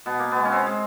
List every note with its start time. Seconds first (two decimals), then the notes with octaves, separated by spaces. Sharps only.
0.06 B2 B3
0.19 A#3
0.32 B3
0.37 G#3
0.45 C#4
0.52 C4
0.67 G#3